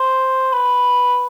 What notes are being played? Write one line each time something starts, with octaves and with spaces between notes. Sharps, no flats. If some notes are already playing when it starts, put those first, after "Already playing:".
Already playing: C5
B4